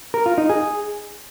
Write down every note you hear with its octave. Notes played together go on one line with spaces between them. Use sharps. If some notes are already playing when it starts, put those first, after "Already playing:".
A#4
F4
D#4
G#4